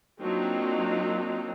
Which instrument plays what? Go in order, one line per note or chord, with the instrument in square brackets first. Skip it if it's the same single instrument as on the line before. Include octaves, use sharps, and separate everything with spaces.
[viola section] F#3 A#3 C4 D4 D#4 F4